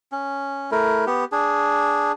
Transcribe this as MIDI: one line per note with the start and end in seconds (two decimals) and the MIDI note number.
0.12 0.70 61
0.71 1.05 57
0.71 1.05 64
0.71 1.05 70
1.07 1.24 59
1.07 1.24 67
1.32 2.12 62
1.32 2.12 68